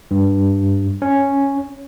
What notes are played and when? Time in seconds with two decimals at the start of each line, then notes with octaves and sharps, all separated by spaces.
0.11 G2
1.02 C#4